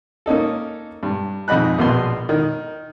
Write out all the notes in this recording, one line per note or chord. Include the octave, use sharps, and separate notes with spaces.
A#3 C#4 D#4 A4
G2
F2 G#2 D#5 B5 F#6
A#1 B2 B4 C6
D#3